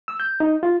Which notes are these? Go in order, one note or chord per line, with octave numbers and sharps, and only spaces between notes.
E6
G6
D#4
F4